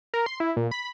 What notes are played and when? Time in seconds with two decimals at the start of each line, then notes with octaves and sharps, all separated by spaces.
0.14 A#4
0.26 C6
0.40 E4
0.56 A#2
0.71 B5